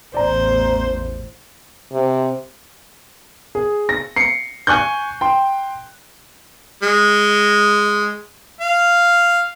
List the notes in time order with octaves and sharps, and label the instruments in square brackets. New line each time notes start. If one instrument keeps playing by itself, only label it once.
[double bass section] A1 E2 [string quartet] C5 [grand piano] D5 A#5
[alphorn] C3
[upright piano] G#4
A#6
C7 C#7
G#5 C#6 F#6 G6
G5 C6
[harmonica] G#3
F5